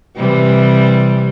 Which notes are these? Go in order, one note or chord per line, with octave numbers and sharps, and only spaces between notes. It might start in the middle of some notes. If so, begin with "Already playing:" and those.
C3 E3 G3